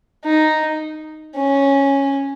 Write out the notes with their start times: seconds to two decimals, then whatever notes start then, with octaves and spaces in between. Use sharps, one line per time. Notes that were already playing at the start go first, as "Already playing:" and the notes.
0.25 D#4
1.36 C#4